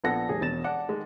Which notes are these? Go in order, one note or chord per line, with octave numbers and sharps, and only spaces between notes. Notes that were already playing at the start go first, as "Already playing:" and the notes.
A#1 B3 A4 F#5 A#6
F1 G3 G#4
E1 B2 A6 E7
D5 F#5 A5
D#3 G#3